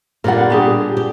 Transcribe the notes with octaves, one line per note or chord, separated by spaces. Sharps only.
A#2 D3 G3 A#4 F#5
D4 G4 G#4
G4